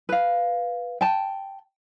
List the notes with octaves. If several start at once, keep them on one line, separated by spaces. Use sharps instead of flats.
B4 F5
G5 A5